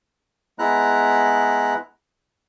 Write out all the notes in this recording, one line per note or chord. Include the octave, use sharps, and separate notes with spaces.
G#3 B3 E4 A#5 F#6